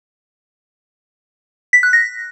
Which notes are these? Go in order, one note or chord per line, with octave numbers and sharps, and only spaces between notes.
B6
F#6
A#6